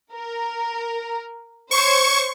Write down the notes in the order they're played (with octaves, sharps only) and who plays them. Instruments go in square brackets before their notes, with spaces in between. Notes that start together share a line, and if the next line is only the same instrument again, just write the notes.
[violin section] A#4
[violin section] C5 C#5 G#6 [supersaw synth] C#6